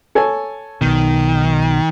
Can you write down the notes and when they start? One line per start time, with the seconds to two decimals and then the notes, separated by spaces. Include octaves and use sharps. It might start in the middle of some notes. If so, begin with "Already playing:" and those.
0.15 A4 C#5 G#5
0.81 B1 B2 D#3